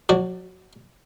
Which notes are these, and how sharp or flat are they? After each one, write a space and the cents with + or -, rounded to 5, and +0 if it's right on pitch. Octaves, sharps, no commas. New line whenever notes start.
F#3 -40 F#4 +10 D5 +0